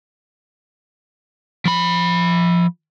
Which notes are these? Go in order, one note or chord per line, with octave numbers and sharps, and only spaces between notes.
F3 B5